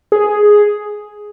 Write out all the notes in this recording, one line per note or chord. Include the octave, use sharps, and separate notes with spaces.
G#4